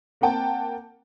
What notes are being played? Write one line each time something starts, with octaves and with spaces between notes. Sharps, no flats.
A#3 C4 F#5 G5 A5